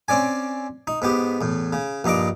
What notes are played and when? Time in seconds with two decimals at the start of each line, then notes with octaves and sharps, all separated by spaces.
0.08 C4 C#4 D5 G#5
0.87 D#4
1.02 G#2 B3 G4
1.41 E2 A2
1.73 C#3
2.04 A#1 G2 D#4 A#5 D6